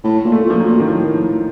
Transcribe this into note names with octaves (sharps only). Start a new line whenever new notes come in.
A2
A#2
A3
A#2 F3
F#3
A#2
D#3
A2 F3
F3